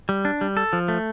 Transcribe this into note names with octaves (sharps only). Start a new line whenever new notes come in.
G3
D4
G3
A4
F3
A3